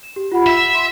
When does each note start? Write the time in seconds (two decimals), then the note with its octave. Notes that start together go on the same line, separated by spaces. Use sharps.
0.03 E7
0.16 G4
0.32 F4 F#5 B5
0.47 E5 B6
0.75 C6